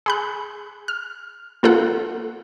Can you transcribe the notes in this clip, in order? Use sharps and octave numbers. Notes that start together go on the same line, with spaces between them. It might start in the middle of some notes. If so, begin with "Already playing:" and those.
G#4 B5 F#6
F6
A#3 F4 A4 F#5